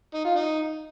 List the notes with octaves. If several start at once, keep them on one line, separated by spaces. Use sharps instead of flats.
D#4
F4
D#4